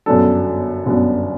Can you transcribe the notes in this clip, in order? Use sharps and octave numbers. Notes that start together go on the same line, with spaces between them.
G1 F#2 F#3 B3 D4 A4
G1 F#2 F#3 B3 D4